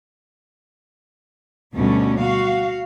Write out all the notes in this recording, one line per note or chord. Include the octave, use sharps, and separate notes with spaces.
D2 B2 G3 A3 C#4
F#4 F5